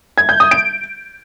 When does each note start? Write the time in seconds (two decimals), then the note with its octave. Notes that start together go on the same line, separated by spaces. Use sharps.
0.18 G#6
0.29 G6
0.40 D#6
0.51 D7